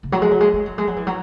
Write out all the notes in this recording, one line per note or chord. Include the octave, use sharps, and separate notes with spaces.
C#3
F#3
G#3
F#3
G#3
G#3
F#3
G#3
F#3
E3
F#3